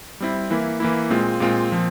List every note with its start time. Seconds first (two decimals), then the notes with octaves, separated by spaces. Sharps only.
0.20 G3 C4 E4
0.50 E3 A#3 E4
0.80 E3 A#3 E4
1.10 A#2 G#3 C4 F4
1.40 A#2 G#3 C4 F4
1.69 A#2 F3 C4